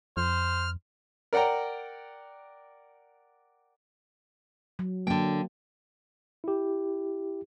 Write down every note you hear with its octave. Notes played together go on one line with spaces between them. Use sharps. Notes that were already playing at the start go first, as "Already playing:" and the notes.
F2 C5 F6
A#4 D5 F#5 G5 A#5
F#3
D3 F#3 A#3 G5
E4 G4